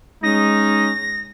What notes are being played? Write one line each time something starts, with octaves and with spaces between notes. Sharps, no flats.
G#3 C#4 D#4 A#6